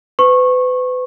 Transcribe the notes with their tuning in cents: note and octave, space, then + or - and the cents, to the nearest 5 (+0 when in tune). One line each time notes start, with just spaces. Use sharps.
B4 +35 C#6 -20